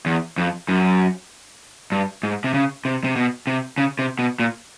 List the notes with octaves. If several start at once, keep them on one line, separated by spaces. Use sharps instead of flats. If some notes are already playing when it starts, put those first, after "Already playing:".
E2
F2
F#2
G2
G#2
C3
C#3
C3
C3
B2
C3
C#3
C3
B2
A#2